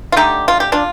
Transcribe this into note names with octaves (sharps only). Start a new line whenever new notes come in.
F4
D3 A3 D#4 G4
F4
G4
D4 F4